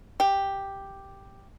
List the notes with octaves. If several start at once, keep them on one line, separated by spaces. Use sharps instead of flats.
G4